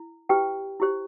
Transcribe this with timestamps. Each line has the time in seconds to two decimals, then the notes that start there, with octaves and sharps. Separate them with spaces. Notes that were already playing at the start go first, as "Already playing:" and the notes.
Already playing: E4
0.29 E4 G4 B4 G5
0.80 E4 G4 C5